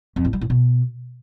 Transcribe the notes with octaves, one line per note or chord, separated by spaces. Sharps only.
F2
A2
G3
A2
B2